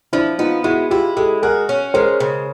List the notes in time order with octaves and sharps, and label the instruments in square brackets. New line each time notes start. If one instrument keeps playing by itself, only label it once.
[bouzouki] F3 [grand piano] D4 E4
[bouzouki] B3 [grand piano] D#4 F4
[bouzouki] G#3 [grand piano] E4 F#4
[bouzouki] E4 [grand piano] F4 G4
[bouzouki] G#3 [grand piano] G4 A4
[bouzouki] F#4 [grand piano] G#4 A#4
[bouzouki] C#4
[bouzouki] G#3 [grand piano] A#4 C5
[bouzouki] C#3